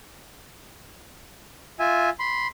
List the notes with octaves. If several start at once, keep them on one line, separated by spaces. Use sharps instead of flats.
F4 E5 G#5
B5 C6